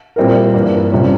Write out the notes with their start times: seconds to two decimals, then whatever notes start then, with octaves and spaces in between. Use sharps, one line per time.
0.16 A#2 G3 C4 E4 A#4
0.54 G2 E3 A#3
0.92 C3 G3 C#4 F4